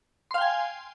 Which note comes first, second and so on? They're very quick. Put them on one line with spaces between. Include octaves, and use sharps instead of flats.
C6 F5 G5 G#5